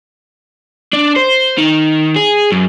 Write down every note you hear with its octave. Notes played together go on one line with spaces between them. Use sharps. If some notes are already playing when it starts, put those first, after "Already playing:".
D4
C5
D#3
G#4
F#2